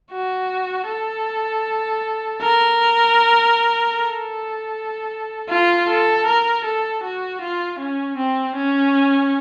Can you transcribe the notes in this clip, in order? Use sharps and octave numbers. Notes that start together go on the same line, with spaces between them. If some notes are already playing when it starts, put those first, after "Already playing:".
F#4
A4
A#4
A4
F4
A4
A#4
A4
F#4
F4
C#4
C4
C#4